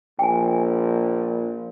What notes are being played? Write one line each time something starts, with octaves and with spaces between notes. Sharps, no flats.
A#1 G5 G#5